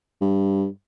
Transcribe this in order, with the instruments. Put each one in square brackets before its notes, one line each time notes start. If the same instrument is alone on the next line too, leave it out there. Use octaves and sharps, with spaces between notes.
[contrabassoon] G2